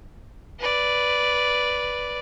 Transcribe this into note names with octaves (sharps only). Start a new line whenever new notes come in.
B4 D5